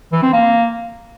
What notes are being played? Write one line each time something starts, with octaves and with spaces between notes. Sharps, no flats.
E3
C4
A#3